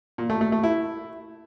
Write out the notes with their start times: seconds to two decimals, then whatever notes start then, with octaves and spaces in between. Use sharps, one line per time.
0.18 A#2
0.30 A3
0.41 A3
0.52 A3
0.64 E4